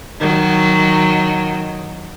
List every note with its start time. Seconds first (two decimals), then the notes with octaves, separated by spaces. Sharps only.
0.20 D#3 F#3